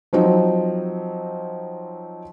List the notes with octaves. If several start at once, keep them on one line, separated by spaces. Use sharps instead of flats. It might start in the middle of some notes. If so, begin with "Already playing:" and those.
F3 F#3 C4 D#4